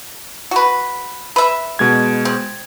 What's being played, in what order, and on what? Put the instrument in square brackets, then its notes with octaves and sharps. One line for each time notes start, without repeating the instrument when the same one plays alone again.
[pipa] F#4 B4
B4 E5
[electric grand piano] B2 G#3 G#6
[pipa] C4